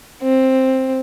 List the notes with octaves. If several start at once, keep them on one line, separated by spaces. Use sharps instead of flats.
C4